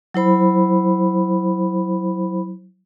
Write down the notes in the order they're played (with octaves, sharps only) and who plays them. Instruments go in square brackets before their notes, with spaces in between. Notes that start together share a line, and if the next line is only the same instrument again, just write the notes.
[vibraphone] F#3 E4 C5 B5